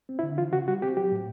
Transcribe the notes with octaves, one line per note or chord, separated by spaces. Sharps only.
C4
E4
D3
E3 F4
C#3 F#4
G3 F#4
C4 G4
F#3 G4
A2